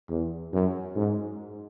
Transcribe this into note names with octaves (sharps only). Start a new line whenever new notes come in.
E2
F#2
G#2